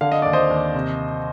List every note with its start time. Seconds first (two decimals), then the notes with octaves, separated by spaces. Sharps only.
0.01 D3 F5
0.12 D#5
0.22 D#2 D5
0.33 C5 D#5
0.50 D#2
0.74 C3